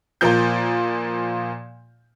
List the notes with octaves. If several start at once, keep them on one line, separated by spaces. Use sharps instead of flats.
A#2 F3 A#3 G6